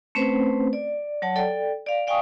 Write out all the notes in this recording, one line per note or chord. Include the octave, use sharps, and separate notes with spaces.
A3 C4 C#4 B4 C5
D5
F#3 C#5 F#5 A5
A4 D5 G5
D5 F5
D5 F5 G5 G#5 C#6 D#6